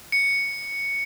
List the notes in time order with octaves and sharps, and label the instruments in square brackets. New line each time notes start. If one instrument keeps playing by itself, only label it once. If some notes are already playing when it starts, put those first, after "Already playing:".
[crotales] C#7